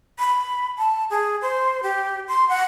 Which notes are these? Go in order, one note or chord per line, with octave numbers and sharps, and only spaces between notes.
B5
A5
G#4
C5
G4
C6
F#5